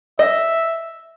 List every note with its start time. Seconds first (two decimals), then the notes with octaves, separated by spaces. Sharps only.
0.19 D#5 E5